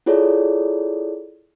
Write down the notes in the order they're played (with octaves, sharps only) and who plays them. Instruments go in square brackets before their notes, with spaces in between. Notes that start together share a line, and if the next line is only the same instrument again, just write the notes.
[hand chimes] E4 F4 G#4 A4 C#5 D5